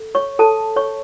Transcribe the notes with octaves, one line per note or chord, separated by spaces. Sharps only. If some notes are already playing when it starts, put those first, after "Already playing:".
Already playing: A4
C#5 C#6
A4 A5
C#5 C#6